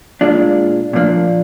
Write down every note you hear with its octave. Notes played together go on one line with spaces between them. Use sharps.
A#2 G#3 D4 F4
A#2 F3 A#3 D4